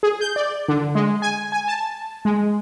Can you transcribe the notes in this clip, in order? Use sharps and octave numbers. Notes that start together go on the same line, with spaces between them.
G#4
G6
D5
D3
G#3
G#5
G#5
A5
G#3